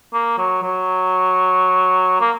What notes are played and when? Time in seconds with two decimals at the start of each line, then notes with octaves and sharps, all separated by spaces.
0.13 A#3
0.38 F#3
0.62 F#3
2.21 A#3